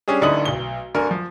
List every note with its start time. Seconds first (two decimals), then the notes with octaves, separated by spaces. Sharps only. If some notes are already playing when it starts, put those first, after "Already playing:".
0.08 G3 C#4 D4 G#4
0.21 D1 D3 D#4 E4 D#6 F#7
0.45 B1 G7
0.94 D1 D3 A#4 G#5
1.11 F3